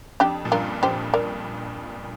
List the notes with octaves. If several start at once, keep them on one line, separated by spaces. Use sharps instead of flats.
F2 D4 G4
A#2
G2 F4 A#4
F2 G4 C5
A#4 D5